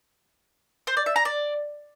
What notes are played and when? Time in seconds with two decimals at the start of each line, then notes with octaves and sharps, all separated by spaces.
0.87 C5
0.97 D5
1.06 E5
1.16 A#5
1.25 D5